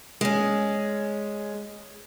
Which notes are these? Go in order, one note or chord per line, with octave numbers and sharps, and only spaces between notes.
G#3 C#4